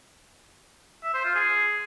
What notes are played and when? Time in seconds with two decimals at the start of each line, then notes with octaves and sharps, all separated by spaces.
1.03 E5
1.14 C5
1.25 F4
1.35 G#4